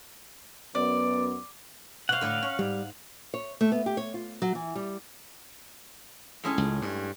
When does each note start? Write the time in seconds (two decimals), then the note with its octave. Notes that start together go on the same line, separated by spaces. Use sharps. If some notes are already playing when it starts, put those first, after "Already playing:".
0.75 F#2 B3 D5
2.09 B2 C5 F5 F#5
2.21 A2 D3
2.42 C#4
2.59 G#2 G3
3.34 C#5
3.61 A3
3.72 B3
3.86 G4
3.97 C#5
4.14 F4
4.42 F#3
4.55 E3
4.75 G3
6.44 A2 G#3 C#4
6.58 C#2
6.82 G2